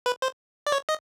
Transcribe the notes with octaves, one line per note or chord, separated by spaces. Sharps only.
B4
C5
D5
C#5
D#5